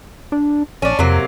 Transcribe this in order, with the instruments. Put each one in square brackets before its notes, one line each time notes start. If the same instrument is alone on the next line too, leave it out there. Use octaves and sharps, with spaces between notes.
[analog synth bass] D4
[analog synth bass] A#1 [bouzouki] C#4 D4
[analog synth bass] F2 [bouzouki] C3 F#3 A#3